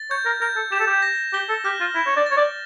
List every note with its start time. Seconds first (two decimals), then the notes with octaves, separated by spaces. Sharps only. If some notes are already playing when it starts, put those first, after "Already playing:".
Already playing: A6
0.11 C#5 G6
0.26 A#4
0.41 A#4 G6
0.57 A4
0.72 G4 E7
0.80 A4
0.87 G4
1.02 A#6
1.33 G4 G7
1.49 A4
1.65 G4 F6
1.81 F4
1.95 E4 E7
2.07 C#5
2.17 D5
2.26 C#5 A6
2.37 D5